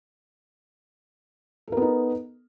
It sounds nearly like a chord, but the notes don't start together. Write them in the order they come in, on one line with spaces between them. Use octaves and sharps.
A4 A#4 B3 D#4